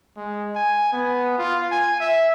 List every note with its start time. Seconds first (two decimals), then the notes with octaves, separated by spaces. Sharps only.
0.17 G#3
0.56 G#5
0.93 B3
1.38 F4
1.71 G#5
2.00 E5